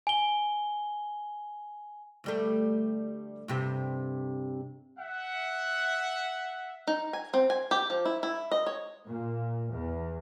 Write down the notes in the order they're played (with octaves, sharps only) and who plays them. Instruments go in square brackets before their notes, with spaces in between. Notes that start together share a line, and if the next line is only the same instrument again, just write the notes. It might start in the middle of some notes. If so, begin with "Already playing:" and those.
[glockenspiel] G#5 G7
[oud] D2 G3 A3
G2 C3 G4
[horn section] E5 F#5
[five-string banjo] D#4
G#5
C4
G#5
G4
F3
E4
E4
D#5
C#5
[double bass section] A#2
E2